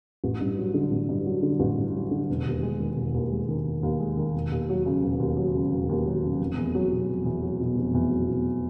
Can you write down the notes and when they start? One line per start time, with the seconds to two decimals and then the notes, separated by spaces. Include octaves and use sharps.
0.24 A1
0.41 G2
0.58 F#3
0.74 D3
0.91 A1
1.09 G2
1.26 F#3
1.42 D3
1.60 A1
1.78 G2
1.94 F#3
2.11 D3
2.29 E1
2.46 D#2
2.62 G#3
2.79 D#3
2.97 E1
3.14 D#2
3.31 G#3
3.48 D#3
3.65 E1
3.83 D#2
4.00 G#3
4.17 D#3
4.34 E1
4.51 D#2
4.69 F#3
4.86 C#3
5.02 E1
5.19 D#2
5.37 F#3
5.55 C#3
5.71 E1
5.89 D#2
6.06 F#3
6.23 C#3
6.39 F1
6.57 E2
6.75 F#3
6.91 B2
7.09 F1
7.25 E2
7.43 F#3
7.60 B2
7.77 F1
7.94 E2
8.11 F#3
8.28 B2